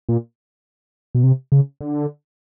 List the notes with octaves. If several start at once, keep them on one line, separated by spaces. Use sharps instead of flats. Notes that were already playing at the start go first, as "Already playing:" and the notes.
A#2
B2
C3
C#3
D3